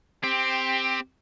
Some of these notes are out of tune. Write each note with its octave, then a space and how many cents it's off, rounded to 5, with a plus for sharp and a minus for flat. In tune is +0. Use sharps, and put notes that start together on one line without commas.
C4 +0 G4 +15